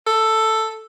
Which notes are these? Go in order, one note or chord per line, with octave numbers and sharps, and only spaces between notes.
A4